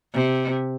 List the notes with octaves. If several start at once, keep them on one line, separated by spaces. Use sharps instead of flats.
C3